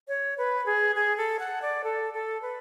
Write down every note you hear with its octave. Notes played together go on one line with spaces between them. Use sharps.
C#5
B4
G#4
G#4
A4
F#5
D5
A4
A4
B4